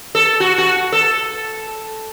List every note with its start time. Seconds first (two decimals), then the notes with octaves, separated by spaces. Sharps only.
0.15 A4
0.40 F#4
0.58 F#4
0.92 A4